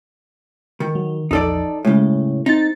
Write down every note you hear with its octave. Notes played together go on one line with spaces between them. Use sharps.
D#3
F#3
A#1 E2 F3 D#4 A4 D5
A2 C#3 G#3
C4 D#4 A6